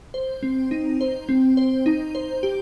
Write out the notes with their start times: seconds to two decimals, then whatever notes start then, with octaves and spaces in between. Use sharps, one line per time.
0.14 C5
0.43 C4
0.71 D#4
1.01 C5
1.29 C4
1.57 C5
1.86 D#4
2.15 C5
2.43 G4